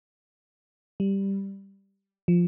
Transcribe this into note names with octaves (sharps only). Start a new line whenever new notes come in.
G3
F3